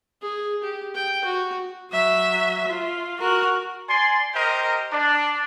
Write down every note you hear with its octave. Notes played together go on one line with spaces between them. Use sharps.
G#4
G4
G5
F#4
F#3 E5
F4
F#4 A#4
D5 G#5 C6
G4 A#4 C5 D#5
D4